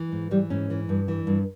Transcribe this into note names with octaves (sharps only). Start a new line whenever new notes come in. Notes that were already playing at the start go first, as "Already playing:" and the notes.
Already playing: E3
G#2
E3 G3
G#2 C#4
E3
G2
E3
G2